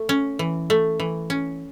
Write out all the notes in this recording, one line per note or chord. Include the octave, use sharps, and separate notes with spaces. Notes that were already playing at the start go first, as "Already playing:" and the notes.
Already playing: A3
C#4
E3
A3
E3
C#4